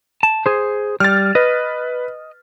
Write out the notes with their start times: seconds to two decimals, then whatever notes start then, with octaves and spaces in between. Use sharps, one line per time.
0.23 A5
0.46 G#4 C5
1.00 G3 F6 A6
1.35 B4 D#5